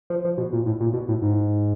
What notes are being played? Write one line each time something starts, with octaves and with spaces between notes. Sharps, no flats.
F3
F3
B2
A#2
A2
A#2
B2
A2
G#2